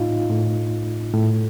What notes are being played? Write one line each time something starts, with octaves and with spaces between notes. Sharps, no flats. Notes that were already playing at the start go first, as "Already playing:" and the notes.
Already playing: A2 D#4 F4
A2
A2